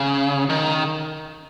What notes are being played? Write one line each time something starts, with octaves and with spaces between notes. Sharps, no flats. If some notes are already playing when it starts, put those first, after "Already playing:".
Already playing: C#3
D#3